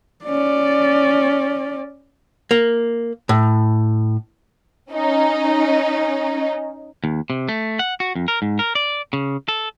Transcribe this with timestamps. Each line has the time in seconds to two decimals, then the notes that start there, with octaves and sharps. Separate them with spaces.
0.25 C#4 D5
2.51 A#3
3.29 A2
4.92 C#4 D#4
7.04 D#2
7.30 C3
7.49 A3
7.79 F#5
8.00 F#4
8.16 F2
8.28 A#4
8.42 G#2
8.59 A#4
8.75 D5
9.13 C#3
9.48 A4